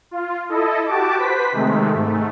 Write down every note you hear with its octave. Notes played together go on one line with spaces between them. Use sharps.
F4
E4 A4 D#5
F#4 G4 A5 D6
B4 C5 B6
C3 D#3 G#3 A3
G#2 A3